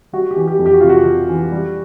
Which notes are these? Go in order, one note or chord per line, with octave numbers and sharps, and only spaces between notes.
G3 F#4
G4
E3
G4
F2
G4
F#4
C3 F4
F#4
C3
E3
G3